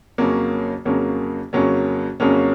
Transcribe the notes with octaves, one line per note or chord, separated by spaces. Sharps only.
F2 C#3 F#3 A#3 C#4
F2 C#3 F#3 A#3 C#4
F2 C#3 F#3 A#3 C#4
F2 C#3 F#3 A#3 C#4